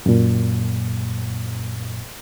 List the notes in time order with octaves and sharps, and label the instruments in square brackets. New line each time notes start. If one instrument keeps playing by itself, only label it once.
[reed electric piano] F#2 A#2